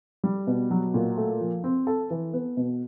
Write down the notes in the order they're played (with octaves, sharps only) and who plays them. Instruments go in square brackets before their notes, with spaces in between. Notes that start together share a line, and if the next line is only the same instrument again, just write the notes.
[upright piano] G3
B2
F#3
A#2
A3
F3
C4
A4
E3
B3
B2